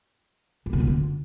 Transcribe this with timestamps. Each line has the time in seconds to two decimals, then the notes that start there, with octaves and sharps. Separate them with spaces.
0.66 E3
0.73 C3
0.80 F#2
0.87 D3